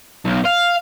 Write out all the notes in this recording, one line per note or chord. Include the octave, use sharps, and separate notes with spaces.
B1
F5